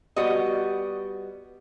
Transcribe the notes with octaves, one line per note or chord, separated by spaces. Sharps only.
G3 B3 F#4 D#5